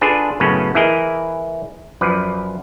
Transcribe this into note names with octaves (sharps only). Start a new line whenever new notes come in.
D4 F4 G#4 A4 B4
F#2 A2 C#3 B3 C#4 B4
E3 E4 G#4 A#4 D#5
F#2 F3 B4 D5